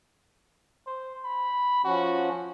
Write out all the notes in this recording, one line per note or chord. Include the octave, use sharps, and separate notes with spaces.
C5
B5
F3 C#4 F#4